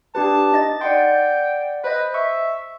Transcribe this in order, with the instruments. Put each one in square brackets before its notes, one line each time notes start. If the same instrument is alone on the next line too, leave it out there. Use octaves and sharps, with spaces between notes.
[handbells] D4 G4 B4 [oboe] A5
[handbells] D#4 D#5 A6
[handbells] D5 F#5 C6 [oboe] G5
[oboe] B4 [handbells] C5 D#5
[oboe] E5 [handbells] C#6